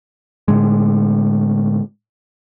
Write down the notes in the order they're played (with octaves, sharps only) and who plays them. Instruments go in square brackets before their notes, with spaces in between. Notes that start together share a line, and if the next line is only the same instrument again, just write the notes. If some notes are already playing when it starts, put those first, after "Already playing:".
[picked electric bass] A2 D3 G#3